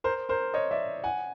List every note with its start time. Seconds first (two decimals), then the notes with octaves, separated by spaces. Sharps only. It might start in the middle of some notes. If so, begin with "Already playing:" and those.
0.04 A#4 C5
0.29 A#4 C5
0.54 C#5 D#5
0.71 D5 E5
1.04 F#5 G#5